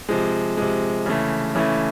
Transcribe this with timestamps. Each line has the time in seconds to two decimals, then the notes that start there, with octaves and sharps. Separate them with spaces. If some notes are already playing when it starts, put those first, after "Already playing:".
0.09 C3 F3 G#3
0.57 C3 F3 G#3
1.06 C#3 E3 A3
1.55 C#3 E3 A3